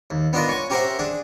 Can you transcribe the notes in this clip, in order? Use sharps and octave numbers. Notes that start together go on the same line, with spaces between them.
D#2
B3 D4 F4 A#4 D#5
C#5 G#5 C#6
C#4 G4 A#4 C5 E5 F#5
D4 G#4